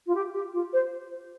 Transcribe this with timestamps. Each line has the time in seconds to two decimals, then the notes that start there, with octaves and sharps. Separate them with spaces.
0.06 F4
0.15 G4
0.33 G4
0.53 F4
0.73 C5